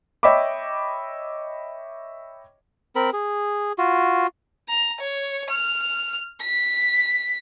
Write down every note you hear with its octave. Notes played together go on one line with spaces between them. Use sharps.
C#5 D#5 E5 G5 B5 D6
C4 A#4 B5
G#4
F4 F#4
A#5
C#5
F6
B6